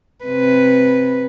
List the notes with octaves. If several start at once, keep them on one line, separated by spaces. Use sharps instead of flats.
C3 B4